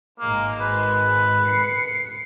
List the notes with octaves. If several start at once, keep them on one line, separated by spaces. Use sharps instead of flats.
G#1 G#3 A#3
B4
C7 C#7